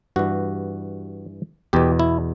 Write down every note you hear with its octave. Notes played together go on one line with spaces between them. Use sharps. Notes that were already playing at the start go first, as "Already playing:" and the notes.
G2 E3 F#4
E2 B2 G4
E4